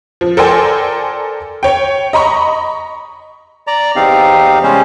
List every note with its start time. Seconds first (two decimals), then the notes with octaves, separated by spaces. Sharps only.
0.21 F3
0.37 A4 A#4 C5 D5 G5 G#5
1.63 C#5 G5
2.13 D#5 A#5 B5 C#6
3.67 D5 A#5
3.96 E2 C4 D#4 G4 F5
4.63 C3 G3 G#3 C#4 C5